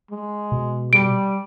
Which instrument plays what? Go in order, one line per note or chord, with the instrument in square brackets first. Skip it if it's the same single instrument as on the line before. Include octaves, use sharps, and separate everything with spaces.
[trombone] G#3
[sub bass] B2
[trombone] G3 [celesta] D7